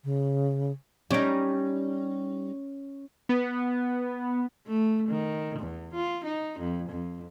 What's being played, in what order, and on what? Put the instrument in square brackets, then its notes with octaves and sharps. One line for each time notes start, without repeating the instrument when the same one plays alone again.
[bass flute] C#3
[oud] G3 D#4 [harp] C#4 D7
[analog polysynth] B3
[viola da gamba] A3
D#3
E2
F4
D#4
F2
F2